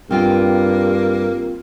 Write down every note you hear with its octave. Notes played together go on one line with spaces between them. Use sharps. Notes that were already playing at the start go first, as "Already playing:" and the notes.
G2 A#3 C4 F4 G5